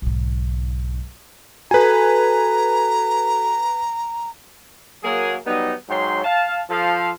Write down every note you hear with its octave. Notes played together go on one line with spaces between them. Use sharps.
B1 G#2
F#4 A4 B4 G#5 A#5
F#3 A#3 G#4
F#3 G3 B3 D#4
G#2 F#3 C#5 G5 C6
F5 A5
F3 A4 F5